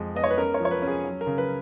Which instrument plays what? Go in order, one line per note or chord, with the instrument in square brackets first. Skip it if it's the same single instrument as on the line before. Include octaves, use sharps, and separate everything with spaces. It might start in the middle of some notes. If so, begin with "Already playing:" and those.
Already playing: [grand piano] F2 G#3
B3 D#5
C#5
B4
C#4 A#4
C#5
F3
C#5
B4
C#4
G#4
F#3
A#4
C#3
B4